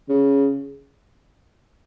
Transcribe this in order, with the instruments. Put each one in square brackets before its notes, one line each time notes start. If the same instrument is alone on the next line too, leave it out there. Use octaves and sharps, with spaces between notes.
[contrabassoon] C#3